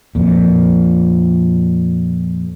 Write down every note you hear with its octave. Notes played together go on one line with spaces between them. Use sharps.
F2 A#2